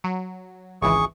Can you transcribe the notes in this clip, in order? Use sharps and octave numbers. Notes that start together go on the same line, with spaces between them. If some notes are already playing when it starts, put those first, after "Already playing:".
F#3
G#1 C#2 E3 G#4 C#6